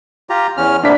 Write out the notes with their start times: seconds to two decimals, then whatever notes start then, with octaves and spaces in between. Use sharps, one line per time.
0.30 F4 G4 A#5
0.57 E2 C#4 F6
0.83 C3 A#3 B3 D4 B6